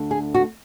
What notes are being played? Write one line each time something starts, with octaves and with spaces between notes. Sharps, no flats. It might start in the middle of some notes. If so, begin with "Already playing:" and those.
Already playing: D2 D3 A3
G#4
F#4